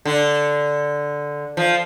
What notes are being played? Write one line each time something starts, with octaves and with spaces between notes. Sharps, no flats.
D3
F3